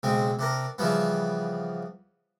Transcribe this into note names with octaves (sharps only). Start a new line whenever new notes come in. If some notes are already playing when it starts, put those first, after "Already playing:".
B1 C#3 G#3 C4
C3 D4 A#4
C#3 E3 F3 G3 B3